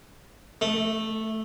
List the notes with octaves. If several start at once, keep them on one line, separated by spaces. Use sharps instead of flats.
A3